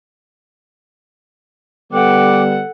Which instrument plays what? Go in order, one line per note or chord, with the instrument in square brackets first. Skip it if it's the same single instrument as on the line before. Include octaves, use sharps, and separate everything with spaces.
[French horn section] D3 G3 B3 [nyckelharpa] A4 F#5 [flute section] G5 D6